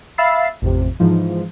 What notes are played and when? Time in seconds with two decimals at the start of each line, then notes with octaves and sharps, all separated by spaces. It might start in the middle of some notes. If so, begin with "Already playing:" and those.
0.18 E5 F5 B5 E6 A6 C7
0.62 A1 F2 C3
1.00 G#2 E3 F3